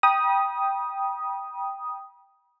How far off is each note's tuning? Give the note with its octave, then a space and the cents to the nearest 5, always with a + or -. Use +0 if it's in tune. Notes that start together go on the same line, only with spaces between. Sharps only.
G5 +0 B5 -40 D#6 +0